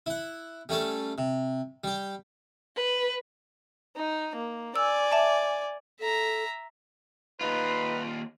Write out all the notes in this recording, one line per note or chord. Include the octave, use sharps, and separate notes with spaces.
E4 F#5
G3 A3 C#4 A4
C3
G3 G4
B4
D#4
A#3
D5 G#5 E6
E5 A5 D6
A4 E5 A#5
D#2 D#4 F4 B4